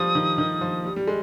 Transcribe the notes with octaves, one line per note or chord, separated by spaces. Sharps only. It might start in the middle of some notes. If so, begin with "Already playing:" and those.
Already playing: F3 G3 D#6
D#3
D#3
F3
G3
G3
G#3